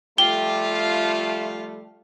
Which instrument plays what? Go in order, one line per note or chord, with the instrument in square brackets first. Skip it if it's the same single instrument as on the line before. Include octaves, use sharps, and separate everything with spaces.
[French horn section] F3 G3 A3 [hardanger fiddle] F4 F5 [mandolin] G4 [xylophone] G7